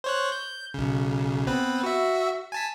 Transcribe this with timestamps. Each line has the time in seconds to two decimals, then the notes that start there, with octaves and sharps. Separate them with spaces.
0.04 C5 C#5 F#6
0.32 G6
0.74 B1 C#3
1.47 B3 C4 B4
1.83 F#4 E5
2.52 G#5 A5 B6